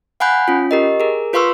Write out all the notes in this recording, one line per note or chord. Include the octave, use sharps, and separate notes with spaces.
F5 F#5 G#5 B5 F#6 G6
C#4 F4
G4 A#4 D#5
G#4 A#4
F4 B4 F5 C6 C#6 E6